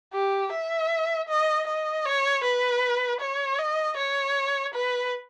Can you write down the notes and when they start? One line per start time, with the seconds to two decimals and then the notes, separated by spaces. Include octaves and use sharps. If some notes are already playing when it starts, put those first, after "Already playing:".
0.14 G4
0.52 E5
1.29 D#5
1.67 D#5
2.05 C#5
2.44 B4
3.21 C#5
3.59 D#5
3.97 C#5
4.74 B4